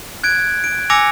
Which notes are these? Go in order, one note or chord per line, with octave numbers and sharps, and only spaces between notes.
F#6 G#6 D7
D7
G#5 D6 E6 A#6 C#7 F7